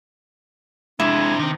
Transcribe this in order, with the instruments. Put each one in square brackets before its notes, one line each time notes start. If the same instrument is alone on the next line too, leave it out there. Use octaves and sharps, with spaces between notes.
[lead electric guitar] F2 C3 [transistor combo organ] G#3 [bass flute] D4 [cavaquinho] E4
[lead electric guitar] C3 C4 [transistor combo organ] D#3